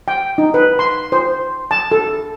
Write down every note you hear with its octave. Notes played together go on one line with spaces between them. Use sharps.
G5
D#4
B4
C6
C5
A5
A4